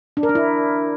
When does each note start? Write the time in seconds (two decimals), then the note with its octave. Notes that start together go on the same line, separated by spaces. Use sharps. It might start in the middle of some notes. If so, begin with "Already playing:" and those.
0.17 D4
0.23 A#4
0.29 D4
0.35 E4